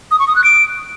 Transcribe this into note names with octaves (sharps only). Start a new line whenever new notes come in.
D#6
C#6
D#6
F#6
D7